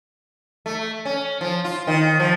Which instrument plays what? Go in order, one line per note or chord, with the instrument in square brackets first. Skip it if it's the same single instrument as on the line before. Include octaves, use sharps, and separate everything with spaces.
[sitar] A3
C#4
F3
F4
D#3
F3